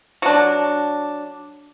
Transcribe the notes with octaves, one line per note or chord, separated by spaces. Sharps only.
F#3 D4